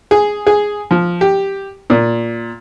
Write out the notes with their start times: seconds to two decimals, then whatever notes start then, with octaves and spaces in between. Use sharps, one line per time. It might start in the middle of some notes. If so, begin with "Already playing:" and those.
0.11 G#4
0.47 G#4
0.91 F3
1.21 G4
1.90 A#2